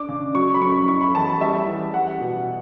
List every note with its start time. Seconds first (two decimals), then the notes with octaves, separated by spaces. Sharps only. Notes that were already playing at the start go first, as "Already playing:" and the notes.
Already playing: D4 D6
0.09 C#3
0.35 F#3 C#6
0.54 B5
0.62 F#2 C#6
0.88 E4 C#6
1.01 B5
1.15 E2 A5
1.27 B5
1.41 G3 E5
1.67 E3
1.94 G3 F#5
2.20 B2